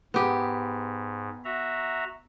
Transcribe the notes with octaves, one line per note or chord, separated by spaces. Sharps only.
G#2 B3 G4
F#4 E5 A#5